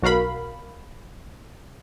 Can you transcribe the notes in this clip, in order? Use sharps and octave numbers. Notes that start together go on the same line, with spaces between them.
B1 F#4 A#4 F5 B5